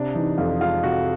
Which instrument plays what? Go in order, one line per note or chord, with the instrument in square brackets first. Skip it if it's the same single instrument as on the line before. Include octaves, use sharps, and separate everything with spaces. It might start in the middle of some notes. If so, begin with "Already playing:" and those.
Already playing: [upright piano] C3 [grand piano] D4
[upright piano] E3 [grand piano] D#4
[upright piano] F2 [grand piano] F4
[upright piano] G#3 [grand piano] F4
[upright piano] C3 [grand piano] F#4